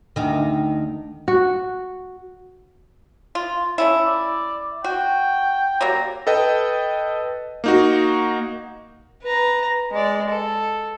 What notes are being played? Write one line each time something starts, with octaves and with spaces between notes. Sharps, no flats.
D2 D#3
F#4
F4
A3 C#4 E4
D5
F#4 G5
F#3 G3 A#3 A#5
A4 B4 D#5 G5
A#3 D#4 F#4
B4 A#5
G#3 D5
A4